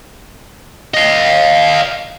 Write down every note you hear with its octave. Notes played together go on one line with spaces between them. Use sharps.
D#5 F5